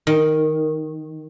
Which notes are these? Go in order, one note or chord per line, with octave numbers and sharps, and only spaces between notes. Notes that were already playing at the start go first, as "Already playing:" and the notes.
D#3